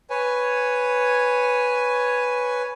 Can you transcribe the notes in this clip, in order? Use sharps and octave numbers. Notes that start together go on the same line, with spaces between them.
B4 C#5 G#5